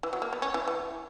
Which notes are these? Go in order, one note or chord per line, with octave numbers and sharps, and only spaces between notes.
E3
F#3
A#3
B3
C#4
E3
E3